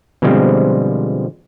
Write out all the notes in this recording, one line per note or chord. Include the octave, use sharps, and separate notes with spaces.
B2 D3 F3 G3 G#3 C4